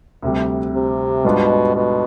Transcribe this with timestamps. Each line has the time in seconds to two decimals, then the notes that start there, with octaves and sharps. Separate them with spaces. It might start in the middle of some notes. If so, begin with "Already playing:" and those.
0.22 D2 C3 G3
0.74 C3
1.25 G#2 B2 G3 D4 F4
1.76 B2